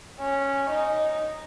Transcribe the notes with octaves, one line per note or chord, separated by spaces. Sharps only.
C#4
D#4